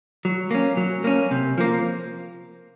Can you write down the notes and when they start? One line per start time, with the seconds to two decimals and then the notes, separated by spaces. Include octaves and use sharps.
0.25 F#3
0.51 A#3 C#4
0.77 F#3
1.04 A#3 C#4
1.31 C3
1.58 F3 A#3